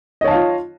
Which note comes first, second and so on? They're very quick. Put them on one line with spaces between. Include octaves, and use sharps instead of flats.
D#5 C#5 A5 F5 F4